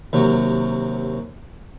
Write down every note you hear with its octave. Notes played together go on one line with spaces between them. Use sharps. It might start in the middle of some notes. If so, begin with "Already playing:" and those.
D#2 C3 F#3